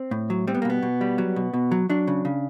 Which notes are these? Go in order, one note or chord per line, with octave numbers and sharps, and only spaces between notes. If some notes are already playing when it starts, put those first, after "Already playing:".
Already playing: C4
A2
F#3
G3 C4
B3
A#3
B2 B3
B2
G3
F#3
B2
B2
F#3
F#3 D4
C#3
C#3